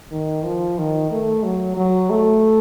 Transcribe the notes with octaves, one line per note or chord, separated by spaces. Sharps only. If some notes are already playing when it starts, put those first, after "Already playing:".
D#3
F3
D#3
A3
F#3
F#3
A3